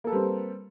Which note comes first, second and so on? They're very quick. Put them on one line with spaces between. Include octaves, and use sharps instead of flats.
A#3 A4 B4 G3 C4